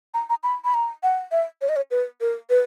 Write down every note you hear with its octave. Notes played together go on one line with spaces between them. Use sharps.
A#5
A#5
B5
B5
A#5
F#5
E5
C#5
D#5
C#5
B4
A#4
B4